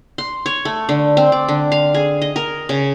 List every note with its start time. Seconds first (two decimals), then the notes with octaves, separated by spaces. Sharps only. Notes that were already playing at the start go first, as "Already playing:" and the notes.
0.18 C6
0.46 C#5
0.65 A3
0.89 D3
1.17 C4
1.32 D5
1.48 D3
1.72 F5
1.94 G#4
2.22 D#5
2.36 A#4
2.69 C#3